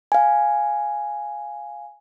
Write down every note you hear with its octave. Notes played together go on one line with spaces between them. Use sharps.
F5 G#5